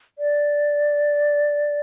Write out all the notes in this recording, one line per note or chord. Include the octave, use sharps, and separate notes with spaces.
D5